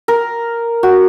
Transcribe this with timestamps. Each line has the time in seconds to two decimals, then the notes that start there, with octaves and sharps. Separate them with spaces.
0.08 A#4
0.83 F#4